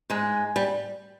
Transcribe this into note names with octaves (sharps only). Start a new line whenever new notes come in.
G#2 G#3
G3